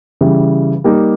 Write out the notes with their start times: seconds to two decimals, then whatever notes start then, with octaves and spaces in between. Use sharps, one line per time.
0.21 C#3 E3 G3
0.84 G3 A#3 D#4 G4